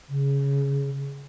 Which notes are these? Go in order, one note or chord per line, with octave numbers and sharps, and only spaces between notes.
C#3